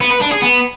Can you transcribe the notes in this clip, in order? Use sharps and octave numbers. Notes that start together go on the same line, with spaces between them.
B3
B4
D4
G#4
B3